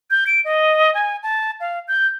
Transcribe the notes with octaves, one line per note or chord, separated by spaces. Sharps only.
G6
D7
D#5
G#5
A5
F5
G6